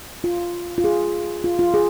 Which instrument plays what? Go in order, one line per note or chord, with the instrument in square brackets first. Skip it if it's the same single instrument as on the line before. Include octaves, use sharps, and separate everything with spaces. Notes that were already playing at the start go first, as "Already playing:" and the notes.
[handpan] F4
F4
G#4
F4
F4
G#4